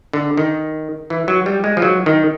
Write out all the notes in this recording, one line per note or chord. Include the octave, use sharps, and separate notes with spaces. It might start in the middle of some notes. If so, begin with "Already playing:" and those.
D3
D#3
E3
F#3
G3
G#3
F3
F#3
D#3